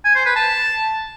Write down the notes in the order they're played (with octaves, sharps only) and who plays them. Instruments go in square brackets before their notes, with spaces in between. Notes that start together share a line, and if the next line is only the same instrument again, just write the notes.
[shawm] G#5
C5
B4
A5